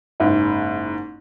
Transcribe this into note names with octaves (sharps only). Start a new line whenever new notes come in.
F#1 G#2 E4